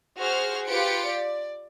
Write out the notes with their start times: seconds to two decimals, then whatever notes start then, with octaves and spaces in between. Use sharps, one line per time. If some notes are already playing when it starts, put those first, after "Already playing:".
0.19 F#4 G#4 C5 F6
0.67 F4 G4 B4 C#7 D7
1.09 D5